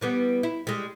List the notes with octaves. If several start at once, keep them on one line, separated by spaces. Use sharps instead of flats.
E3 G3 B3
E4
G3 G#3